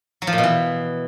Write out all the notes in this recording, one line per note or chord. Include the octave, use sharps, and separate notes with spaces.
F#3
F3
A#2
B2
E3